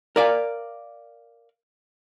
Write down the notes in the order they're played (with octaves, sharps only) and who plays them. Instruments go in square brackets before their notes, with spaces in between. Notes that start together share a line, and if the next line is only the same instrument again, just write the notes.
[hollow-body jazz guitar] A#4 D5 F5